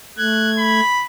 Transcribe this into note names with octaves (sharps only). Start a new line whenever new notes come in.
A3 F#6 G#6
B5